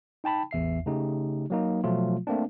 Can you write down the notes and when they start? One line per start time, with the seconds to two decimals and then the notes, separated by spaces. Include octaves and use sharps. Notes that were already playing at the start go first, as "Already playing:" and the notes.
0.24 D#4 G5 A5 B5
0.51 A1 E2 E5 C7
0.86 C#3 A3 D#4 G4
1.50 F#3 A#3 D#4
1.84 B2 F3 F#3 A3 F4
2.27 A3 A#3 C4 D4